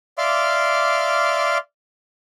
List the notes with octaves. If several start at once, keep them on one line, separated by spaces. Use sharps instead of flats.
D5 E5 F5 C6 D6 F6